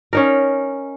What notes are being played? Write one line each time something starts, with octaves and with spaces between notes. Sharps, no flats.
C#4 D#4 A#4